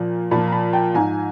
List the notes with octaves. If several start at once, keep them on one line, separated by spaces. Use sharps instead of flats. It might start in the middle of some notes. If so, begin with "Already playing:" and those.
Already playing: A#2 F3
A#2 F3 A5 B5
A#5
A5 B5
G5 A5
G#2 F3 G#5 A#5